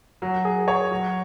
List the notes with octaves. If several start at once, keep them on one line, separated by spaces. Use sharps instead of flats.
F#3
G#4
C#5
F#3